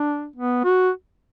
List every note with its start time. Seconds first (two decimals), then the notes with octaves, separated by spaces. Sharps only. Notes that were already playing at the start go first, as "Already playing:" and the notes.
Already playing: D4
0.36 B3
0.64 F#4